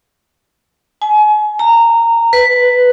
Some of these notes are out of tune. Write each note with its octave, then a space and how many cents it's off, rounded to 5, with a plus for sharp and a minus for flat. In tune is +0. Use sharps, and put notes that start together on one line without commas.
G#5 +35
A#5 -15
B4 +5